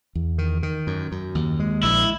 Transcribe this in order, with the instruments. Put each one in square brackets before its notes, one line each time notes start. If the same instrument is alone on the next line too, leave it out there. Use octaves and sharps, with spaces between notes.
[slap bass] E2
D#3
D#3
F#2
F#2
D#2
G#3
[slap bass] A#1 [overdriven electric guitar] E4